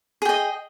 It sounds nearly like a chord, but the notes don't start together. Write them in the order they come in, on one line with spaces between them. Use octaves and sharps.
G#4 G5 D#5